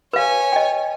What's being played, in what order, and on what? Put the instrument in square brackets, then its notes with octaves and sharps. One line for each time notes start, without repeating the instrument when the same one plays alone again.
[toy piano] B4 F5 [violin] C#5 G#5
[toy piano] D#5 G5